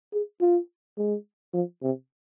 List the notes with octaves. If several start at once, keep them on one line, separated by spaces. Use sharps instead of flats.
G#4
F4
G#3
F3
C3